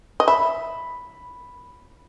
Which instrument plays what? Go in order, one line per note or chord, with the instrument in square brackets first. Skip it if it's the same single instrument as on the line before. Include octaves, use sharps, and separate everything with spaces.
[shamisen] D#5
[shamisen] E5 [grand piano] B5